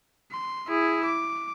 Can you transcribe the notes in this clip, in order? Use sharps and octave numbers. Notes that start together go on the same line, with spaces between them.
C6
E4 G#4
D6